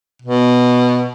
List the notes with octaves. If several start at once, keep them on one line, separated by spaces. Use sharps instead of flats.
B2